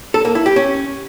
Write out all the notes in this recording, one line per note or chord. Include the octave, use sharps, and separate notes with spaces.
A4
A#3
E4
G4
C#4